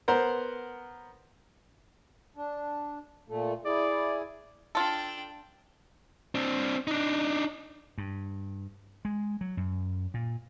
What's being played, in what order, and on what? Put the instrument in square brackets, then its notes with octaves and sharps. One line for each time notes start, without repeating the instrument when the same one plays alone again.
[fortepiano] B3 A#4 C5 F#5
[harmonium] D4
A#2 A3
[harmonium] E4 G#4 [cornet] D5
[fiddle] D4 G5 [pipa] F4 A4
[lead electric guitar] C4 D4
D4 D#4
[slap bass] G2
G#3
F#3
F#2
A#2